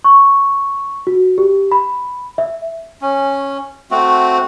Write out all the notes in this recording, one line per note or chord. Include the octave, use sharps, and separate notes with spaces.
C#6
F#4
G4
B5
E5
C#4
A3 C4 F#4